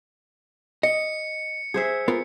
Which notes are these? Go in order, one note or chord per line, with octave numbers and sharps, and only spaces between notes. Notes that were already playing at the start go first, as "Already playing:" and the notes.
D#5 C#7
G#4 C5 E5
B3 F4 A#4